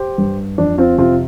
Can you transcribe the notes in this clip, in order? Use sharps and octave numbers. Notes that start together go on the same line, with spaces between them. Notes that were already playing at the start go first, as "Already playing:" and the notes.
Already playing: G4 C5
G2
F2 D4
C4 F4
C3 C4 F4